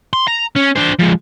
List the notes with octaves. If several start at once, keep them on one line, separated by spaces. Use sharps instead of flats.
C6
A#5
C#4
D4 C5
F3 G#3